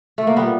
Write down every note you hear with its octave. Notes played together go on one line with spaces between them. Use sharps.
A3
A#3
A#2 G3 B3